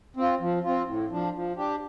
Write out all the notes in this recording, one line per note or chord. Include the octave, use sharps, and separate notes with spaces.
C4 F4
F3
C4 F4
A2
F3 D4
F3
D4 G4